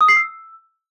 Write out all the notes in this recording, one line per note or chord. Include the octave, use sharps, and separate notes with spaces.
D#6
C7
E6